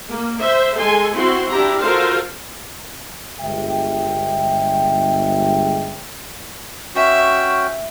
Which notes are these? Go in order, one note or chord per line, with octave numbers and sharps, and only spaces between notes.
A#3
C5 E5
G#3 A4 G#5 C6
C4 E4 F#4 C6
D4 E4 G4 A#5
F4 F#4 A4 A#4 C5 F5
G1 G#3 E5 G5
C#4 F#4 E5 G5